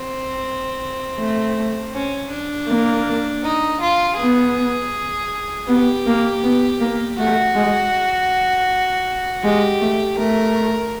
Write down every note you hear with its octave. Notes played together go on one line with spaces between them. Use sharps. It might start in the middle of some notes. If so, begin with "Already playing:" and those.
Already playing: C4
A3
C#4
D4
A#3
D#4
F4
B3 G#4
B3 G4
A#3
B3
A#3
A3 F#4
G#3
G#3 G4
A3
A3 A#4